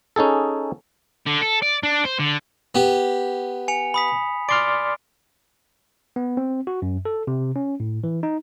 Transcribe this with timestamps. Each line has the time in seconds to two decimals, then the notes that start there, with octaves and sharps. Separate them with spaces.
0.16 C#4 D#4 G#4 A4
1.27 D3
1.42 A4
1.63 D5
1.83 D4
2.05 C5
2.19 D3
2.75 B3 G4
3.68 G#5 C#7 F7
3.94 B5 D#6 B6
4.49 D5 C6 F6 D7
6.16 B3
6.37 C4
6.67 F#4
6.82 F#2
7.05 A4
7.27 C3
7.56 C#4
7.80 A2
8.04 E3
8.23 D#4